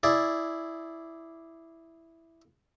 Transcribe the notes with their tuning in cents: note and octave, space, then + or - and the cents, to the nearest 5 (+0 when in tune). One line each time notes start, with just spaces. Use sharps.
E4 +0 G#4 +0 D5 -5